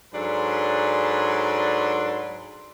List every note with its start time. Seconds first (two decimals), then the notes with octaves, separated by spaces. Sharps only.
0.13 G#2 F#3 D4 A4 B4 C6